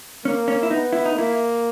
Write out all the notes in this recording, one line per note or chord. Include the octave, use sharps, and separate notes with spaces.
A#3 C#4
C#4
E4
B3 D#4
E4
D#4
A#3 E4